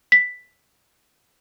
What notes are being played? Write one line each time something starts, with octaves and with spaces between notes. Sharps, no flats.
B6